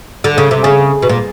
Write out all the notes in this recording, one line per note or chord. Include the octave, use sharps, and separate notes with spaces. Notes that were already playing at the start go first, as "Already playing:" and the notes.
D3
C#3
C3
C#3 G#4
B2
A#2